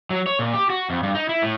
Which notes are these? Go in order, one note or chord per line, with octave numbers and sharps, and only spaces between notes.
F#3
C#5
A#2
G4
F#4
F2
G2
D#4
E4
A2